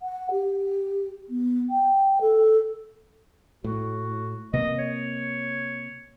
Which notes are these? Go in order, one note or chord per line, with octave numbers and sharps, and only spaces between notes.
F#5
G4
B3
G5
A4
A2 F#4
C3 A#3 D#5
C#5